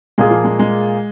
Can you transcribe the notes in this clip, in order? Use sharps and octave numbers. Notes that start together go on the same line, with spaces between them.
A#2 G#3 A#3 F4 G#4
F3
G#3
G#3